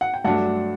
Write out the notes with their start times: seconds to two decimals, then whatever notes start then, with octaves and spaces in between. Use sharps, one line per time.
0.01 F#5
0.14 G5
0.24 G2 F#3 A3 D4 F#5 A5